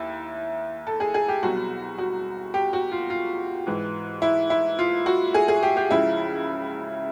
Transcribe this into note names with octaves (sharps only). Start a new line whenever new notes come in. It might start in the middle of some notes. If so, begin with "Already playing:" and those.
Already playing: D#2 E4
A4
G#4
G#4
G4
C2 B2 F#3 F#4
F#4
G4
F#4
F4
F4
G#2 E3
E4
E4
F4
F#4
G#4
G#4
G4
G4
C#2 C#3 F3 E4